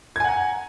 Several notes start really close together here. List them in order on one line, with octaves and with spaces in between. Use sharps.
G#6 G#5 F#5 A#5